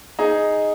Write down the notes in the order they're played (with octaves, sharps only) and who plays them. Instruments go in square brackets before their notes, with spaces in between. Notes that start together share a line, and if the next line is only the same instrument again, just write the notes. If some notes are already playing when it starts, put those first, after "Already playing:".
[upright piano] D#4 G#4